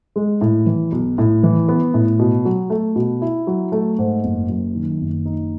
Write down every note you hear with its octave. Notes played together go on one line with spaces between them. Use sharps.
G#3
A2
E3
B1
A2
E3
B3
A2
B2
F#3
A3
B2
E4
F#3
A3
G#2
F#1
F#2
D#3
F#1
D#4